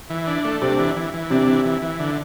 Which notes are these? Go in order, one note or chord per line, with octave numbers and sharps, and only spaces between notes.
E3
D4
A3
C3 C4 D4
E3
E3
E3
C3 C4 D4
E3
E3
E3
D3